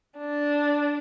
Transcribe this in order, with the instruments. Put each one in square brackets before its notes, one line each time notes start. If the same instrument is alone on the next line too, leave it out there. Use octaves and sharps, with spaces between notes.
[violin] D4